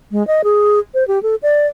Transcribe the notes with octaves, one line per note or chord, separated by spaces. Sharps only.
G#3
D#5
G#4
C5
G4
A4
D5